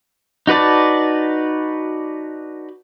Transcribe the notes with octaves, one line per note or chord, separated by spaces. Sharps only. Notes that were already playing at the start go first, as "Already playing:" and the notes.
D#4 F#4 B4 D5 A5